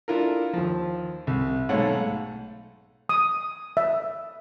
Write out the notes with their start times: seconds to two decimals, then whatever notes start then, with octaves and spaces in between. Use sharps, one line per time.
0.08 D4 E4 F4 A4 A#4
0.53 D#2 F3
1.27 C2
1.69 B1 G#2 A3 C#5 F5 F#5
3.09 D#6
3.77 E5